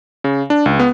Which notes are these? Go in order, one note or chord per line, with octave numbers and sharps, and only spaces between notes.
C#3
D4
C#2
B3